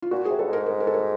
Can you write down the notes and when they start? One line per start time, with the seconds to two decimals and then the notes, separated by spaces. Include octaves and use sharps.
0.02 F4
0.11 A#2 F#4
0.25 C3 G#4
0.39 G2 A4
0.48 G#2
0.53 A#4
0.66 A#4
0.80 A#4
0.87 A4
0.94 A#4